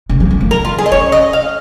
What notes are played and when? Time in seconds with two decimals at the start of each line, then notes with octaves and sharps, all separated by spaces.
0.09 C#3
0.20 F3
0.31 G#3
0.41 A#3
0.51 A#4
0.65 F4
0.79 G#4
0.86 D#5
0.92 C#4 C#5
1.12 D#5
1.33 F5